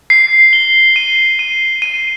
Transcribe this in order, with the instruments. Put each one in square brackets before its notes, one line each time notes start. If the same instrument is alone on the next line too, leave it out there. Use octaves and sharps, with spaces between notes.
[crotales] C7
G7
D#7
D#7
D#7